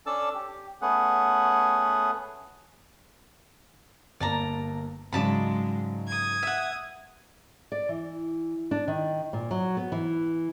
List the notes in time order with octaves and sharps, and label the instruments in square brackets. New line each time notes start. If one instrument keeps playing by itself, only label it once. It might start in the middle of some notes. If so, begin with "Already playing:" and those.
[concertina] C#4 D4 A4 D5 A5 E6
G4
A3 B3 C#4 G#4 F#5
[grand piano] G1 A#3 [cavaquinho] D5 A5 A#5
[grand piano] G#2 C#3 F#3 [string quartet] G#3 [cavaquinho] D5 A5 B5
[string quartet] D#6 G#6
[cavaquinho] E5 F#5
[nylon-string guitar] D5
E3
D4
D#3
A#2
F#3
B3
E3